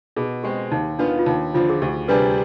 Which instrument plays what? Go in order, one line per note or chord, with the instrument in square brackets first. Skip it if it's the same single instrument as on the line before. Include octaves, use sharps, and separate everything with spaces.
[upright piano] B2 [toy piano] G#4
[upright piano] G#3 C4 [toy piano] G4
[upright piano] D#2 [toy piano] D#4
[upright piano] D#3 B3 F4 [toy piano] D4
[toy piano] F4
[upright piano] D#2 [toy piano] D#4
[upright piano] D3 F3 [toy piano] F4
[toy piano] G#4
[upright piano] D2 [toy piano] G4
[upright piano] C3 G3 D4 G#4 [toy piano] B4